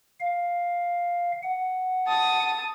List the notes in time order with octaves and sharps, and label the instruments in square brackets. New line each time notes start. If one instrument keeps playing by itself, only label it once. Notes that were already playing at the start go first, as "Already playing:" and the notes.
[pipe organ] F5
F#5
[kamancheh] A5 D#6